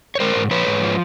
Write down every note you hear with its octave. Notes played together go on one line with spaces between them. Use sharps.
C#5
G#3 A#4 C5
G#2
F3 B4 C#5
G#2
F3